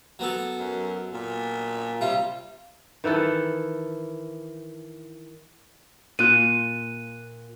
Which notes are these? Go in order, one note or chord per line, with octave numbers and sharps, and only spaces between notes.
F#3 B3 A4
F#2
A#2
C3 G3 F4
D#3 E3 E4 A4
A#2 F4 F#6 D#7